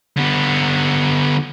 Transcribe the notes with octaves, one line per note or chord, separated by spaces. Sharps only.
D3 B3